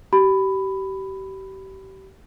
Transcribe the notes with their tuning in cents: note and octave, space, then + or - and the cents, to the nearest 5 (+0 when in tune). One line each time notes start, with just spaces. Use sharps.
G4 -35 B5 +10